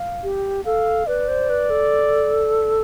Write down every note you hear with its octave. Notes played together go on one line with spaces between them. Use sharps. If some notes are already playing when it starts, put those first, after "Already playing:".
Already playing: F5
G4
A4 F5
B4 D5
C5
B4
A4